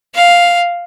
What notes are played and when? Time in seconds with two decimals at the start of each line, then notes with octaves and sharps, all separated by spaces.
0.15 F5